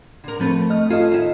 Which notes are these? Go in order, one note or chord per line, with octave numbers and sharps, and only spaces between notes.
D3 A#4
F3 A3 C4 A4 B4
D#5 F6
C#4 F4 A4 D#5
D#3 E5